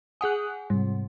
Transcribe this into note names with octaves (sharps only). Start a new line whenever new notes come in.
G#4 F#5 G#5 D#6 F#6
G#2 C3 G3